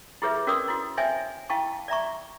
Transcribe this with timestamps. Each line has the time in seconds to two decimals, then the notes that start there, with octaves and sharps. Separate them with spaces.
0.22 E4 G4 G#4 B4 C#5 E5
0.47 C#4 F#4 A#4 C#5 D5 D#6
0.68 E4 F#4
0.97 C5 C#5 D#5 E5 G5 G#5
1.50 E4 F5 G5 A5 C#6
1.88 D5 E5 A#5 C#6